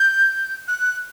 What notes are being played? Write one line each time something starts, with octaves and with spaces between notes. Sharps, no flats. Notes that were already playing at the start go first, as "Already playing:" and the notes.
Already playing: G6
F#6